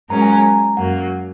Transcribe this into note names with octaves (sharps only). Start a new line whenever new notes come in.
G#2 F#3 C#4 A#4 A#5
G#5
A#5
F#2 F#3 A#3 F#5